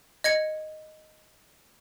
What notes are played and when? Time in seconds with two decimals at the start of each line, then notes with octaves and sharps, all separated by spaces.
0.24 D#5 G#6 C#7